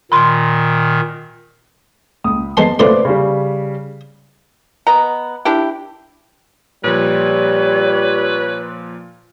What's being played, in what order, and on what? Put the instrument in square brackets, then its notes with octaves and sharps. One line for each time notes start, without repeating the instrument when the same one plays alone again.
[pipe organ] A#2 D#3 [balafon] B5 C6
[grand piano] C#2 D#6
[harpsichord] G#3 B3 C6 [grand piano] A5 C7
[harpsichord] C#2 A3 C6 [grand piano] B3 C4 D5
[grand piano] C#3 G3
[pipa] B3 D#5 A#5
D4 E4 G4
[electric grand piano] A#2 F3 [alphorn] G3 [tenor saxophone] B4 [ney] C#5